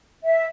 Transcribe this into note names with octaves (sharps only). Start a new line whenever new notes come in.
E5